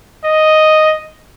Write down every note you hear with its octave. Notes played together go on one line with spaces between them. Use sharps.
D#5